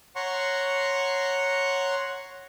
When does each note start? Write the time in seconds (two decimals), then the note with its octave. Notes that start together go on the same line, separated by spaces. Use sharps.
0.16 C#5 F#5 A#5 C6 C#6